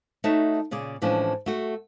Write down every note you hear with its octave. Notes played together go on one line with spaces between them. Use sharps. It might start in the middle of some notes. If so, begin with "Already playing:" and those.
A3 D#4 F#4 C#5 E5 A5
A#2 C#3 G#4 D5
A2 E3 F3 G#3 C#4 D4
A3 F#4